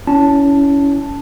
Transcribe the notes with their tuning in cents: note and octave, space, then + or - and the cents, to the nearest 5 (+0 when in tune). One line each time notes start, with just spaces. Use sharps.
C#4 +25 E4 +0 A5 +0